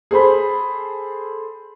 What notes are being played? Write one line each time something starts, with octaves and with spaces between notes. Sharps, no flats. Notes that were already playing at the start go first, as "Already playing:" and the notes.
G#4 A4 C5 B5